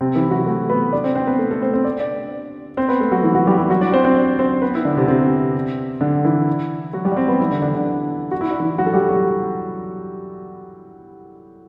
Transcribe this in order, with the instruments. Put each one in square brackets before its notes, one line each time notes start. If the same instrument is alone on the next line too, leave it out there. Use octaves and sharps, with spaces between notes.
[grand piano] C3 C4
E3 E4
F#3 F#4
A3 A4
B3 B4
D4 D5
C4 C5
C4 C5
B3 B4
A3 A4
A3 A4
C4 C5
C4 C5
D5
D4 D5
C4 C5
B3 B4
A3 A4
F#3 F#4
E3 E4
F#3 F#4
G3 G4
E3 E4
F#3 F#4
D4 D5
C4 C5
C4 C5
D4 D5
C4 C5
B3 B4
E4
D3 D4
C3 C4
C3 C4
D3 D4
E3 E4
F#3 F#4
G3 G4
D5
C4 C5
B3 B4
E3 E4
D3 D4
D3 D4
D3 D4
F#4
E4
D4
E3 E4
F#3 F#4
A4
G3 G4
F#3 F#4